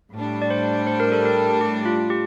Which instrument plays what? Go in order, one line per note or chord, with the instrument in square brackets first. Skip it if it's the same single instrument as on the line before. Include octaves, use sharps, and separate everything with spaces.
[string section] A2 G3 D4
[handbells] D5
C5
C5
A#4
A4
A#4
G4
F4
G4